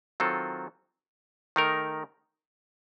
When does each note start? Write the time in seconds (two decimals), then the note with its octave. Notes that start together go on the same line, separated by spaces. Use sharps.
0.20 D#3 F#3 C4 F4 A4
1.56 D#3 A3 D#4 A#4